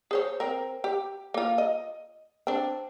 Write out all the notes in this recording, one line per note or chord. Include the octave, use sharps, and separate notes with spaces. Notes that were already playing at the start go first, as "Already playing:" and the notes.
G#4 C5 C#5
C4 A#4
G4
A#3 F4
D#5
C4 D4